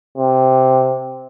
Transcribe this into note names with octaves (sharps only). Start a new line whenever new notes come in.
C3